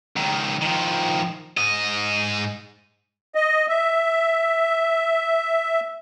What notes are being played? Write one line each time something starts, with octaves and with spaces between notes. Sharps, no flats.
C#2 D#3
D#3 F3
G#2 D#5
D#5
E5